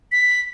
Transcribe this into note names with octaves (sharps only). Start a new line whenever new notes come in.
B6